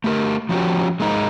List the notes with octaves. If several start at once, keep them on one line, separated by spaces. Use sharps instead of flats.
A3 G4 A#4
F3 C#4 F#4 G4
G#3 A#3 D#4